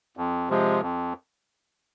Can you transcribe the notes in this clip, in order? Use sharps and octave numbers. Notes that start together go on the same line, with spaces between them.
F2
C3 F3 G#3
F2